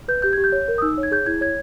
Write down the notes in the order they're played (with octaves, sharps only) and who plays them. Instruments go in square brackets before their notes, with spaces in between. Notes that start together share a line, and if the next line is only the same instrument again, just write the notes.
[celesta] B4 G6
G4 G6
G4 G#6
G6
C#5
A#4
D#6
D#4 E6
C#5
G#6
G#4 G6
E4 G#6
C#5 G#6